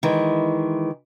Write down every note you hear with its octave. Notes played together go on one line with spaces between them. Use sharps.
D#3 E3 G#3